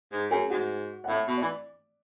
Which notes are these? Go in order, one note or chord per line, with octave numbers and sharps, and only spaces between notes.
G#2
F#2 G#4
G#2 F#4
F#5
A2 E5
B2
E3 D5